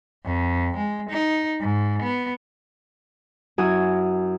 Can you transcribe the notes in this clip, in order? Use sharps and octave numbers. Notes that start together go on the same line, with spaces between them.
F2
G#3
D#4
G#2
B3
F#2 E4 F#4 G#5 D#6